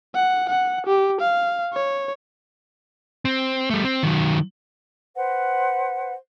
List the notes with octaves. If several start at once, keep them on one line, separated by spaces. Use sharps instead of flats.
F#5
F#5
G4
F5
C#5
C4
G3 A3
C4
D#3 F#3
B4 C5 F#5